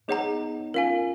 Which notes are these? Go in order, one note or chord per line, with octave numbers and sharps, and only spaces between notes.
B3 D#4 G#4 C#5 F#5 A#5
C#4 F4 A#4 F5 G#5